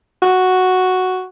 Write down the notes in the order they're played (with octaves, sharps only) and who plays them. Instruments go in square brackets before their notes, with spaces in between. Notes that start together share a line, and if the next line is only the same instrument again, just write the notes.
[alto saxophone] F#4